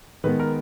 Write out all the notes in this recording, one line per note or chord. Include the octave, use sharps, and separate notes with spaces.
D#3 G#3 B3 B4
A#4